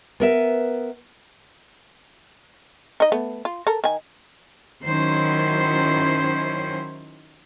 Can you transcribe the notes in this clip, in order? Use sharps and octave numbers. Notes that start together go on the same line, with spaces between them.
B3 A#4 E5
D#4 D#5
A3 B3
F4
A4 A#4
D#3 G#5
D#3 F#3 C#4 E4 C5